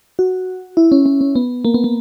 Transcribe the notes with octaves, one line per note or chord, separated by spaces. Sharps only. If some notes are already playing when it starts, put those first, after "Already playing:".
F#4
E4
C#4
C#4
C#4
B3
A#3
B3
A#3